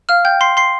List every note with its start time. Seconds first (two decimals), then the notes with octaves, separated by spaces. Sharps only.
0.09 F5 F6
0.25 G5 G6
0.41 C6 C7
0.57 C6 C7